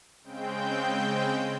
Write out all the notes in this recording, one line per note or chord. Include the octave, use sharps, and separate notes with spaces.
C#3 G#3 C4 G5 G6